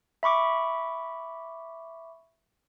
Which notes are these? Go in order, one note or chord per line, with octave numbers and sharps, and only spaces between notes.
E5 B5 C#6 D6